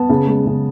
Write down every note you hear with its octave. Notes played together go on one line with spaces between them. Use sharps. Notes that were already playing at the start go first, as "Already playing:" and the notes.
Already playing: B3 A5
C#3
G#3
C#3